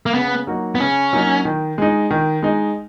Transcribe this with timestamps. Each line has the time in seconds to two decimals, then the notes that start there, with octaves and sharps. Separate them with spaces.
0.06 A#3
0.14 C#3 B3
0.47 F#3 A#3 D#4 F#4
0.75 B3
0.80 C#3 C#4
1.13 F#3 A#3 D#4 F#4
1.45 D#3
1.78 G#3 D#4
2.11 D#3
2.43 G#3 D#4